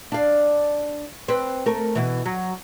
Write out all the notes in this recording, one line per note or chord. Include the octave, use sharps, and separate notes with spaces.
D4 F5
C4 B4
A3 A#4
B2 E3
F#3